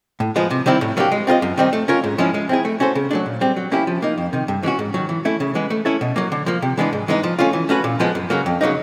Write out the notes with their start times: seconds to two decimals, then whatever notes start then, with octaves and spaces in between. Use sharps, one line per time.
0.20 A2
0.36 F3 G#3 B3
0.51 C3
0.66 D#3 G3 C4 E4
0.81 A2
0.97 F#3 A#3 D4 G4
1.12 G#3
1.27 C4 F4 A#4 D#5
1.42 F#2
1.57 D#3 G3 C4 D#4
1.73 A3
1.88 C#4 F4 A#4 C#5
2.04 G#2
2.18 F3 G#3 C#4 E4
2.34 G#3
2.49 C4 E4 G#4
2.65 A3
2.80 C#4 F#4 A4 C5
2.95 C#3
3.11 F#3 A3 D4
3.26 A#2
3.41 G3 C4
3.57 F#3
3.71 A#3 C#4 E4 G4
3.87 F3
4.02 A#3 D#4
4.18 F2
4.33 C3 D#3
4.48 G2
4.63 E3 G#3 C#4 F#4
4.79 G#2
4.94 D#3 F#3
5.09 E3
5.25 A3 C#4 E4
5.40 C#3
5.55 E3 G#3 B3
5.70 A3
5.85 C#4 E4 A4 C#5
6.01 B2
6.16 F#3 A#3
6.32 D3
6.46 F3 A#3
6.62 C3
6.77 E3 G#3 B3 D4
6.93 G#2
7.08 E3 G#3 B3 D#4
7.23 F3
7.39 A3 C#4 F4
7.53 E3
7.69 A3 C#4 F#4 B4
7.84 A#2
8.00 F3 G#3 B3
8.15 F#2
8.30 C#3 F#3 A#3
8.46 F2
8.61 C#3 F#3 A#3 D#4